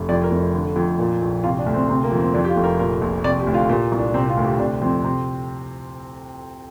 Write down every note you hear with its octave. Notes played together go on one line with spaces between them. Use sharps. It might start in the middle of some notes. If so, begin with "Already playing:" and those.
Already playing: F1
F2 D5
A#4
F1
D3
F2
A#2
A#1
C3 F4
D4
D2
C4
C3 C4
A#3
F2
C4
F2 D4
G4
F4
F1
A#4
A#2 A#4
A#1
C3 D5
G4
D2
F4
A#2 G4
C2
D4
C3 C4
F4
D2
G4
C3 D4
F2 C4
C3